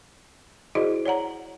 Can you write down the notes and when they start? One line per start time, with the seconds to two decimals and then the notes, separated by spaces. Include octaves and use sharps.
0.75 E4 F#4 G#4 C5 D5 D#5
1.06 C#5 D5 F#5 A#5